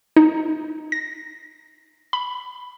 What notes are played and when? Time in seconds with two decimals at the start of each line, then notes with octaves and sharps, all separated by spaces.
0.17 D#4
0.92 A#6
2.13 B5